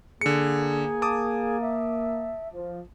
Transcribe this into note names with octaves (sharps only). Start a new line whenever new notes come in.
D3 A#3 G#4 C#7
A5 D6 D#6
E5
F3